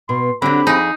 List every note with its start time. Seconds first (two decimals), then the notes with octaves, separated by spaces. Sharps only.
0.09 B2 B3 C6
0.42 D3 F#3 C4 G4 B5
0.67 F2 D#4 G#4